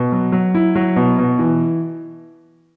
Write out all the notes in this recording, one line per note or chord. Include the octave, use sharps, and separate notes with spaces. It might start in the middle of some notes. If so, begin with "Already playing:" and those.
Already playing: B2
F#3
F#3
E4
F#3
B2
B2
E3